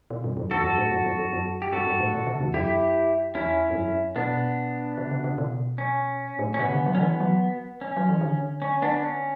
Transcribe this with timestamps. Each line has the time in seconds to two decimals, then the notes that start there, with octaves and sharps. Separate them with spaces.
0.10 B2
0.24 G2
0.37 F#2
0.51 E2 F#4 A4
0.64 F#2
0.78 A2
0.91 F#2
1.06 F#2
1.19 F#2
1.33 F#2
1.62 G4
1.72 G2 F#4 A4
1.87 G2
2.00 A2
2.14 B2
2.27 C#3
2.40 E2
2.54 F#2 E4 G4
3.35 E2 C#4 E4
3.70 G2
3.75 F#2
4.16 B2 B3 D4
4.98 C#3
5.11 C#3
5.24 C#3
5.38 B2
5.78 C#4
6.39 A2
6.54 C#4
6.59 C#3 B3
6.72 D3
6.86 F#3
6.95 C#4
6.99 E3 B3
7.20 F#3
7.81 C#4
7.97 F#3
8.09 E3
8.21 D3
8.62 C#4
8.82 B3 D4
9.03 C#4